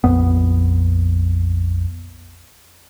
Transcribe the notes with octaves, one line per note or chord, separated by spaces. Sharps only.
A#1 F2 B3